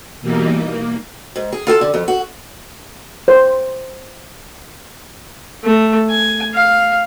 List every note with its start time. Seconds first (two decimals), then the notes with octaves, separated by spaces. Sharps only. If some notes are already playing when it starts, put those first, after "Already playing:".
0.21 B2 E3 G3 A#3 D#4
0.65 A#3
1.36 G#2
1.52 G#4
1.67 F4 A4 G#5 A5
1.81 D3
1.94 F2
2.08 F#4
3.28 C5
5.64 A3
6.10 G#5
6.54 F5